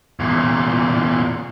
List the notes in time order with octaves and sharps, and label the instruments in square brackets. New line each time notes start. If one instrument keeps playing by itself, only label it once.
[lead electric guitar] E2 A#2